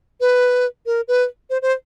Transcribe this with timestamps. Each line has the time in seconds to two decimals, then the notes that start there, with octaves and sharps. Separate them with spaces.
0.21 B4
0.86 A#4
1.08 B4
1.50 C5
1.62 C5